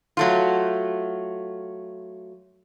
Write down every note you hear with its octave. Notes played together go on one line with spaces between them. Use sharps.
F#3 A3 F4